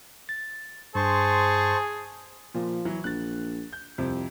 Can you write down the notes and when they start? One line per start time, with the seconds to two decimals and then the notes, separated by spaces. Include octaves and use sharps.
0.29 A6
0.95 G2 G#4 C5 A5 C6 C#6
2.55 A#2 F3
2.85 E3 F#3
3.04 A#1 F#6 A6
3.73 G6
3.98 C2 F2 C3